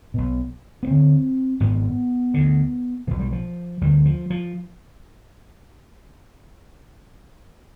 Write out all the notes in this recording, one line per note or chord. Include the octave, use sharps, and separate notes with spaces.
B1 B2
B3
D2 D3 C4
G#1 G#2 B3
D2 D3
B1 B2 F3
G3
F3
D2 D3 G3
F3
F3